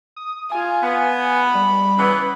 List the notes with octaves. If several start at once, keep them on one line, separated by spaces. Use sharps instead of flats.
D#6
F4 G#5
B3
B5
G3
C#3 E3 B3